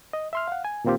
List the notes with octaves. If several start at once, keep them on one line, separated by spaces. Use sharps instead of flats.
D#5
E5 C6 F6
F5 F#5
G#5
A#2 D#3 A#3 C4 F4 G4